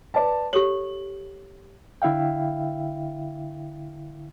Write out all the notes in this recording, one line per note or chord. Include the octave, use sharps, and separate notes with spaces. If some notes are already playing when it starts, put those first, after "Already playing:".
B4 D5 A5
G4 A4 C#5 F#7
D3 E4 E5 F5 G5